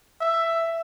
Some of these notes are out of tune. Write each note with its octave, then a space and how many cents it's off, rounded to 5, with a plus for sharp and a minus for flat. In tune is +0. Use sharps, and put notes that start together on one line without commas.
E5 +10